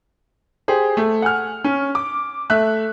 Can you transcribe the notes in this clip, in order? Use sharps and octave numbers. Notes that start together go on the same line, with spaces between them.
G4 G#4 C5
A3
F#5 G#5 F6
C#4
D6
A3 E5 F#6